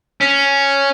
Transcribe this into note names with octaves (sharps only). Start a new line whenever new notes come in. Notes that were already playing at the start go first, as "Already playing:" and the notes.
C#4